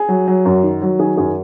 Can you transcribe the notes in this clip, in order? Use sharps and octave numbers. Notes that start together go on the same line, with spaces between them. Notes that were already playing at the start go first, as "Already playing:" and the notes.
Already playing: G#4
F#3
F#3
F#2
D#3
F#3
D#3 G#4
F#2 G#4